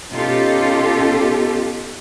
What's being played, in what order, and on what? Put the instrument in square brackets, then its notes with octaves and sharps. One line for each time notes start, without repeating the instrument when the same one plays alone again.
[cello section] B2 C#4 D#4 F4 G4 A4